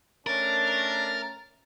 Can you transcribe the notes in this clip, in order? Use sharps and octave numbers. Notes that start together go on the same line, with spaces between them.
A3 C#4 D4 A#4 A6